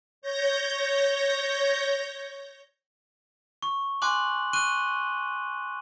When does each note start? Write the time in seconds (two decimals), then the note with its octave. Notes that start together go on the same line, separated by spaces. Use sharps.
0.22 C#5 G6 A#6
3.63 C#6
4.02 G#5 C6 D6 F#6 F#7
4.53 C#6 F#6 D#7 G7